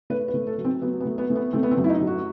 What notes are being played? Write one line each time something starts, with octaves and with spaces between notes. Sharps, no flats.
A3 B4
B4
A3
A4
F#3
C4
F#3 B3
B3
A3
B3
A3
B3
A3 C4
B3
C4
F#2
E4
D#4
F#3
F#4